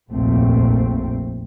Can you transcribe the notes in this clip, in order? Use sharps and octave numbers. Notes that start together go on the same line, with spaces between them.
F1 A#1 D#2 A#2 A3 C4